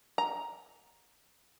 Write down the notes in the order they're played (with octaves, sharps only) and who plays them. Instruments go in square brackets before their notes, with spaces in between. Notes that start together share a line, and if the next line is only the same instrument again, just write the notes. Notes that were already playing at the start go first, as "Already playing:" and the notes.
[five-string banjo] A#5